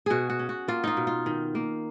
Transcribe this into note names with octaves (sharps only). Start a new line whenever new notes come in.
B2 F#4 G#4
F#4
C#4
F#4
A#3 F4
D#4 F4
B2
F4
D#3
A#3